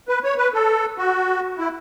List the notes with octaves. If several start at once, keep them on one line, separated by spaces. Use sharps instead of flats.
B4
C#5
B4
A4
F#4
E4